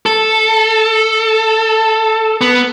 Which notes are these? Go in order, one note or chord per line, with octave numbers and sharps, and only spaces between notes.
A4
B3